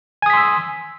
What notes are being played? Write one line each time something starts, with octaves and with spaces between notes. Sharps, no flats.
G#5 C6 D#6 E6 B6